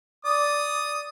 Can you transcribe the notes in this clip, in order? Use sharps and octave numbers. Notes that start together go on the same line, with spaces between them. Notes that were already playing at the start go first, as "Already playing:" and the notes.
D5 D#6